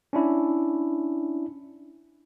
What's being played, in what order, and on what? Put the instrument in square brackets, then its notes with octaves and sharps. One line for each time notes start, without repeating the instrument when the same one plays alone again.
[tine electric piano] C#4 D4 E4